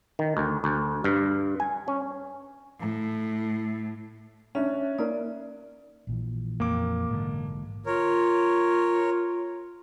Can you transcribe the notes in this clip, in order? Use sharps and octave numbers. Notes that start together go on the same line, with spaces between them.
D#3
D2
D2
G2
G#5
C#4
A2
C#4 D4 E5
A#3 D#4 A#4 D5
A#1 A#2 E3
F2 A#3 D6
G#2 D3
F4 A#4 C#5